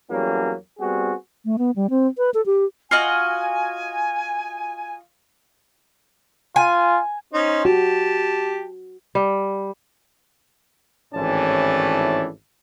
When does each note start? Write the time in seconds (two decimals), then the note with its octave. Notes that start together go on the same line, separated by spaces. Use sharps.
0.10 E2 F#3 G3 A#3 C#4
0.79 G3 B3 C4 F#4 G#4
1.45 A3
1.58 B3
1.76 G3
1.90 C4
2.18 B4
2.34 A4
2.46 G4
2.91 F4 F#4 D#5 G#5
6.56 F4 G#5
7.34 C#4 D#4 C5
7.65 F#4 G4 A5
9.15 G3
11.14 G#1 A2 E3 C#4 D5 A5